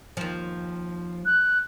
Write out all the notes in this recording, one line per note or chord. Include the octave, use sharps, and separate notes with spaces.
D#2 F3
F#6